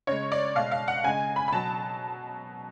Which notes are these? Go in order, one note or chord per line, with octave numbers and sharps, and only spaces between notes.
C#3 G#3 C#5
D5
B2 G#3 F5
F5
F#5
C#3 G#3 G#5
B5
B5
B2 F#3 A5